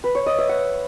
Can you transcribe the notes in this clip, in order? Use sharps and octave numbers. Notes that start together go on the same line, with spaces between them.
B4
C#5
D#5
E5
F#5